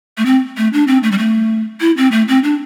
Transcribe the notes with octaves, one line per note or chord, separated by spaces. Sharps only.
A3
C4
A3
D4
C4
A3
G3
A3
E4
C4
A3
C4
D4